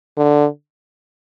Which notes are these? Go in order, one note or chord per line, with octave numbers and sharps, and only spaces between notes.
D3